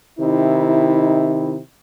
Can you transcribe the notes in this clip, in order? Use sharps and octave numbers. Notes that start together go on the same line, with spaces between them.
C3 D#3 D#4 E4